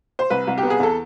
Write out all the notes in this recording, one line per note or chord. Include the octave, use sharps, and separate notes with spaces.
C5
C2 B4
C2
G4
B3
G#4
E2 A4